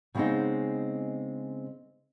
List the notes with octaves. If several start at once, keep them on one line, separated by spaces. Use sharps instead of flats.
C#3 G3 G#3 B3 C4 D#4